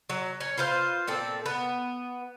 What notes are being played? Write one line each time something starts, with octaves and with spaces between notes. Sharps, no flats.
F#3
C#4
F4 B4 C5 F5
A#2 C4 A4
B3